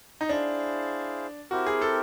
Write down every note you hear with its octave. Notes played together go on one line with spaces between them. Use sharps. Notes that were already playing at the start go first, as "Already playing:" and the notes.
D#4
D4 E4 G#4 C5 F5
C4 E4 F#4 G4 A#4
G#4
A4